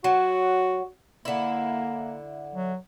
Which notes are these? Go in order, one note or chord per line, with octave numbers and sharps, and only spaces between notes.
F#3 F#4
D3 A#3 E4
F#3